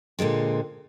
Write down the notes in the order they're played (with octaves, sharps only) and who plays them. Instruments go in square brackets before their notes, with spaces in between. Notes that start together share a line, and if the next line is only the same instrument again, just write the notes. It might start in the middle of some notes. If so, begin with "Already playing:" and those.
[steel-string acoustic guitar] A#2 D3 G#3 C4